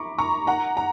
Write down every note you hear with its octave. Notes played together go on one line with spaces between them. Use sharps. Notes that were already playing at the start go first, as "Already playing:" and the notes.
Already playing: A#5 B5 C#6 D6
A#5 C#6
F#5 A#5
A#5